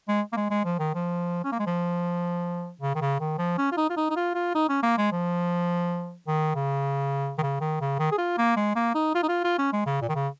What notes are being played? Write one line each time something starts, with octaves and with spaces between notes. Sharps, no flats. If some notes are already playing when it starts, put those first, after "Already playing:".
G#3
A#3
G#3
G#3
F3
D#3
F3
C#4
A#3
G#3
F3
C#3
D#3
C#3
D#3
F3
C#4
F4
D#4
F4
D#4
D#4
F4
F4
D#4
C#4
A#3
G#3
F3
D#3
C#3
D#3
C#3
D#3
C#3
D#3
G#4
F4
A#3
G#3
A#3
D#4
F4
D#4
F4
F4
C#4
G#3
C#3
A#2
D#3
C#3